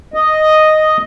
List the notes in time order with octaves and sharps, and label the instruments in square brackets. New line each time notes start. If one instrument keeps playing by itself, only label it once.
[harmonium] D#5